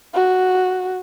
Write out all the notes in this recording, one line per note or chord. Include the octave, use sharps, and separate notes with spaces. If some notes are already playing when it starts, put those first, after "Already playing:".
F#4